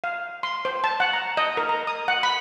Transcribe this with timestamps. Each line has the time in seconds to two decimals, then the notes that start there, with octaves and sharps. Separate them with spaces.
0.04 F5
0.43 C6
0.65 C5
0.84 A5
1.00 F#5
1.13 A#5
1.37 D#5
1.57 A#4
1.69 A#5
1.87 D#6
2.08 F#5
2.23 B5